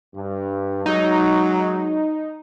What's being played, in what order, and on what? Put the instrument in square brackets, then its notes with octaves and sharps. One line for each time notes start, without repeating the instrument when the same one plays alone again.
[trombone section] G2
[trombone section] F#3 G#3 [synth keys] D#4